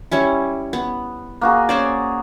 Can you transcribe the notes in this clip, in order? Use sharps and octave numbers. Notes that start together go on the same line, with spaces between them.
G3 C#4 E4
B3
A#3 F#4 G#4
C#4 C5 D5